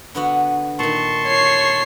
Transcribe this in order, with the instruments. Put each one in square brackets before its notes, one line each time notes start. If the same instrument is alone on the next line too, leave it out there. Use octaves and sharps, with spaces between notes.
[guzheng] D3 B3 F#4
[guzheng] A#2 D#3 [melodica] A5 C6 C#6
[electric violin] C#5 C7